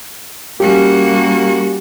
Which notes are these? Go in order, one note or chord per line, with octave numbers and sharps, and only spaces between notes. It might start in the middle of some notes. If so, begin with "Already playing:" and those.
G3 A#3 C#4 F#4 G4